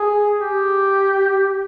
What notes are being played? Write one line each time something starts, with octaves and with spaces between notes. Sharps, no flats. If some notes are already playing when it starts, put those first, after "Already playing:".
Already playing: G#4
G4